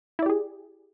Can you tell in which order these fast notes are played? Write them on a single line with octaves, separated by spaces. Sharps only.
E4 D5 G4 G#4